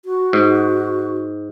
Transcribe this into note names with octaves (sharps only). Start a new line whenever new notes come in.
F#4
G#2